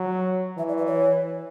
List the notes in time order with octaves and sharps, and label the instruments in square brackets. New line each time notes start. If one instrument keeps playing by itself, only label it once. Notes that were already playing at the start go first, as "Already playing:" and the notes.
Already playing: [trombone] F#3
[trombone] E3 [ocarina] E5
[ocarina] D5
B4
C#5